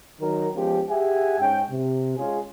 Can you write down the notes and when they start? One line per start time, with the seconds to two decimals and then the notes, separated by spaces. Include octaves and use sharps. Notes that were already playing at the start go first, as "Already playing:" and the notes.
0.20 D#3 F#3 A#4
0.55 F3 G#3 B3 C#4 G4
0.89 G4 G#4 E5 F#5 G#5
1.39 G#2 G#3 C#4 G5
1.71 C3
2.17 G#3 C#4 F4 G#4